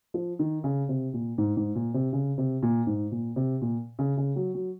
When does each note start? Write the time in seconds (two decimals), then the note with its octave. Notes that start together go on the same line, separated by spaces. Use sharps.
0.14 F3
0.39 D#3
0.64 C#3
0.89 C3
1.14 A#2
1.38 G#2
1.57 G#2
1.75 A#2
1.94 C3
2.13 C#3
2.38 C3
2.63 A#2
2.87 G#2
3.12 A#2
3.36 C3
3.62 A#2
3.99 C#3
4.17 C#3
4.36 F#3
4.55 F#3